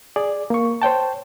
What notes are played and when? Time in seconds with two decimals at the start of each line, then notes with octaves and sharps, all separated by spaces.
0.16 G#4 D5
0.50 A#3 C#6
0.82 C5 C#5 G5 A5